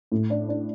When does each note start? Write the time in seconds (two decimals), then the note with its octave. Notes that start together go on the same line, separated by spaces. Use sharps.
0.12 A2
0.30 D4
0.49 D4